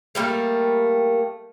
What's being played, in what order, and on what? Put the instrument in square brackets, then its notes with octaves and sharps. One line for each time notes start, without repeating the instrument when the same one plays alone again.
[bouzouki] G3 A3 A#3